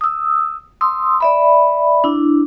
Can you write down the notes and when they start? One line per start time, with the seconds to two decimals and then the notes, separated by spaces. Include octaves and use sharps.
0.01 D#6 E6
0.81 C6 D#6 E6
1.20 D5 E5 B5
2.04 D4 E4